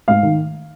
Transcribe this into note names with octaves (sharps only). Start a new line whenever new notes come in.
G#2 F5
D#3